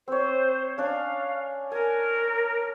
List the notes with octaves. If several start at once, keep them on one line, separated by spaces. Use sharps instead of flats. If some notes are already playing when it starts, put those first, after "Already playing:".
C4 C5 C#5
C#4 D4 F5
A#4 G#5